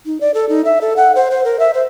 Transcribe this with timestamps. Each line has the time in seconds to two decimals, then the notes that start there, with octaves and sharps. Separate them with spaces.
0.06 D#4
0.21 D5
0.34 A4
0.49 D#4
0.65 E5
0.81 A4
0.97 F#5
1.15 C5
1.31 C5
1.45 A#4
1.59 E5
1.74 C5